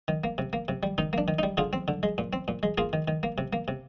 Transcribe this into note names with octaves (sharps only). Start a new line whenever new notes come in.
D#3
A#3
C3
A#3
C3
G3
D#3 D#4
A#3 D4
D#3
G3 D#4
D3 F4 G#4
C4
D3
G#3
A#2
C4
A#2
G#3
A#3 F4 G#4
D#3
D#3
A#3
C3
A#3
C3